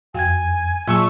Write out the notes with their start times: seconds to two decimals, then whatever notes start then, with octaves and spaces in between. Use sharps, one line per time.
0.14 F2 F#4 F5 G5 G#5 G#6
0.88 A#2 F#3 G#4 A5 C#6 E6